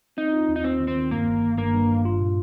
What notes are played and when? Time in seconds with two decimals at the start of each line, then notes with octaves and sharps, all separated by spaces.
0.17 C4 D#4
0.33 F4
0.48 D#2
0.56 D#4
0.64 D#2 C4
0.80 D#3
0.88 C4
0.96 D#3
1.11 G2 A#3
1.26 G1
1.43 G1
1.58 G2 A#3
1.74 G2
1.89 G2
2.05 F4
2.20 A#2